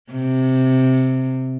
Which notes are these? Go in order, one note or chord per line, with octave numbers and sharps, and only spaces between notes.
C3